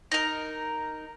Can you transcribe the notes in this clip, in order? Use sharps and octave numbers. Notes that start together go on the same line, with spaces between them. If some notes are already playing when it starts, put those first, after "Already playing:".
D#4 A#4